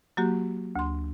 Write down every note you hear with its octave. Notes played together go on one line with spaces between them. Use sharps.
F#3 A#3 F#4 G4
D2 C6